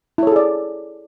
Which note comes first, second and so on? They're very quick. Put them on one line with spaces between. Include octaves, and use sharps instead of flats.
E4 C#5 A4 G#4 D5